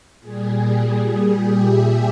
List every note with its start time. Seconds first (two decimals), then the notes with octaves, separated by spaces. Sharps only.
0.20 A#2 G3 G#4
0.57 G#4
1.29 G4
1.64 E5